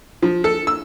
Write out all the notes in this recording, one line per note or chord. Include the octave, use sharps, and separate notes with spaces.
F3
A4
E6